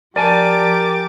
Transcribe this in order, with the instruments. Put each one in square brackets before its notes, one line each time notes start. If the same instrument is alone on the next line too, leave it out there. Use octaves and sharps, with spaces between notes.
[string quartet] F3 D6 A6 [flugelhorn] G4 [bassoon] A#4 [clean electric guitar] D5 G#5 A5